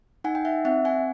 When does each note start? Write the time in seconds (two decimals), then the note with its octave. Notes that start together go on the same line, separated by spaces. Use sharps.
0.24 D#4 F#5 G#5
0.35 G5
0.45 E5 F#5
0.65 C4 E5 F#5
0.85 F#5 G#5